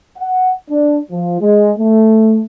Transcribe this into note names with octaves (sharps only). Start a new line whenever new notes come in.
F#5
D4
F3
G#3
A3